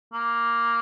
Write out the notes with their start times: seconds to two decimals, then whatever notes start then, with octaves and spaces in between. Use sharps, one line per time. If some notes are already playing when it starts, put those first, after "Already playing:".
0.13 A#3